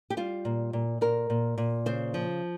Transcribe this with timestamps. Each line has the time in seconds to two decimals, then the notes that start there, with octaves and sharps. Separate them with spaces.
0.10 G4
0.17 G3 F4
0.45 A#2
0.73 A#2
1.01 A#2 A#4
1.30 A#2
1.58 A#2
1.86 C#3 C5
2.14 F3